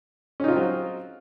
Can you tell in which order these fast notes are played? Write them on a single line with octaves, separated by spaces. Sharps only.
C#4 D#4 F4 C4 F#3